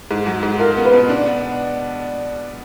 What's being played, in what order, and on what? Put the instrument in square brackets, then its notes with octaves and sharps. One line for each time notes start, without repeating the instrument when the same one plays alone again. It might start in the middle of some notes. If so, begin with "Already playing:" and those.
[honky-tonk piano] G#2
F#3
G#2
[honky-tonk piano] F4 [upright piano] A#4
[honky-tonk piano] B3
[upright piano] B4
[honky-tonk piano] B2
D4
B3